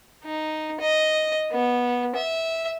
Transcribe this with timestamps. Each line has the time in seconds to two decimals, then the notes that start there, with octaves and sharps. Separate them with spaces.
0.24 D#4
0.80 D#5
1.52 B3
2.16 E5